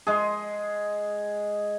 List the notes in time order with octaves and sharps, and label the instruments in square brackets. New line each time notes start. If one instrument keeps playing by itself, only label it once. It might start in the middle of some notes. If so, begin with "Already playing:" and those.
[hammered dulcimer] G#3 G#4